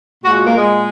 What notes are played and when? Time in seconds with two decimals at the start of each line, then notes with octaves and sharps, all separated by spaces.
0.24 A#2 G#3 F#4
0.35 F#4
0.47 A#3
0.57 G#3